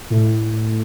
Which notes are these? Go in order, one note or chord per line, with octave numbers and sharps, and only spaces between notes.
A2